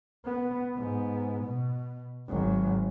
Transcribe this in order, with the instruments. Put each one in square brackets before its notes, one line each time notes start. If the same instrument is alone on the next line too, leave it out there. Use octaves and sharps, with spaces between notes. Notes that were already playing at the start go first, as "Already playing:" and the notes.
[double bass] B3
G#2 B3
B2
G#1 F#3